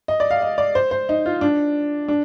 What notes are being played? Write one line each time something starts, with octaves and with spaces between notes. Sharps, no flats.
D#5
D5
F5
D#5
D5
C5
C5
D#4
F4
D4
D4